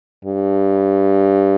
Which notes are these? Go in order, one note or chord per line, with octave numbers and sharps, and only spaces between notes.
G2